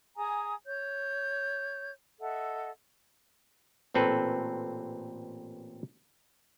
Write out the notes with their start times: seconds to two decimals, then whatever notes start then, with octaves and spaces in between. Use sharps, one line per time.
0.17 G#4 G#5 A#5 D#6
0.65 C#5 G6
2.20 A4 D#5 E5 F#5
3.94 A1 A#2 C4 A4 B4